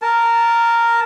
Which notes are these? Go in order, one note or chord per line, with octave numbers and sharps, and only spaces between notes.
A#4 A5